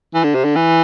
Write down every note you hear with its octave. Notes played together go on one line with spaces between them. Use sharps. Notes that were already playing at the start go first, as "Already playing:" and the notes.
E3
D3
C3
D3
E3